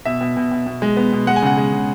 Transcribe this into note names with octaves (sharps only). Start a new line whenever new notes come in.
B2 E5
B2
B2
B2
B2
G#3
B3
B2
G#3 F#5
G#5
C#3 F#5
G#3
C#3